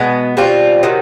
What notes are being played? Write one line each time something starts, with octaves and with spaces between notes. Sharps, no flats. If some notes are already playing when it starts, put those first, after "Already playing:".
Already playing: B2 G#3 B3
B2 G3 C4 F4
C3 D#3 F#3